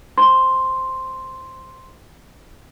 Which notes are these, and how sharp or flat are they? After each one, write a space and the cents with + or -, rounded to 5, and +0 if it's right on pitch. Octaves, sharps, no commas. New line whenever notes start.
C5 +0 C6 +0